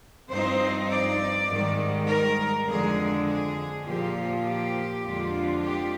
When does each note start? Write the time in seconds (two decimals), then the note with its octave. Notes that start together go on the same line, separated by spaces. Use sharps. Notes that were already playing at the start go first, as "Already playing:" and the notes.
0.30 G2 F3 C4 D#4 C5
0.89 D5
1.48 G#2 D#3 G3
2.07 A#4
2.66 F2 D3 G#3 G#4
3.26 G#4
3.84 A#2 F3 A#3 F4 G4
4.43 G4
5.02 F2 D3 G#3 D4 F4
5.61 G4